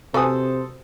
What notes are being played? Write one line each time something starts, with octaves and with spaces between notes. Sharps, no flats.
C3 F#4 A4 B4 C5 G#5 D#6